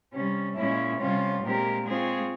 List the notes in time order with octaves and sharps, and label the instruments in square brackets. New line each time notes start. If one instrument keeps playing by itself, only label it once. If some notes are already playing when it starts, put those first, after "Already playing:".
[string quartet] C3 G3 C#4
A#2 G#3 C#4 E4
C3 G3 C#4 F4
A#2 G#3 C4 G4 A#4
G#3 C4 F4 G#4 C#5